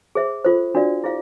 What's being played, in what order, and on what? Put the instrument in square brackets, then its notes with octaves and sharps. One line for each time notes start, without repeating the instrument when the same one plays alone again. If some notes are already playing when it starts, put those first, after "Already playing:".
[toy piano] G#4 C5 E5
F4 A4 C5
D4 F#4 A#4 D5 F5
E4 G#4 C5 F5